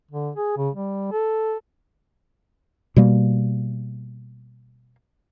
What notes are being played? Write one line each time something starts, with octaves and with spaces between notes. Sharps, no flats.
D3
G#4
C#3
G3
A4
B2 G3 A#3